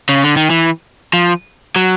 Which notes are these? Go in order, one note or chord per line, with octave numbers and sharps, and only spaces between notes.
C#3
D3
D#3
E3
F3
F#3